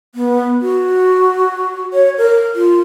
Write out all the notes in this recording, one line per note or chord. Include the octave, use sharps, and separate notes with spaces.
B3
F#4
C#5
A#4
F4